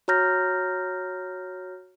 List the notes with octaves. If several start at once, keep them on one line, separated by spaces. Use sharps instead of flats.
F#4 C#5 A#5 F6 G6 A#6